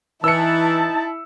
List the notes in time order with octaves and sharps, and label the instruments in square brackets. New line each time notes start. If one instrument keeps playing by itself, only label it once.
[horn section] E3 [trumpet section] D#4 A5 [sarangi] E4 [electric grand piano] E6 C#7